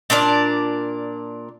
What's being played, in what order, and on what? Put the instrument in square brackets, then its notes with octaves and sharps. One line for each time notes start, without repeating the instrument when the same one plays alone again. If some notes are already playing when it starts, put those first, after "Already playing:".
[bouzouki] A#2 D4 A#4 D5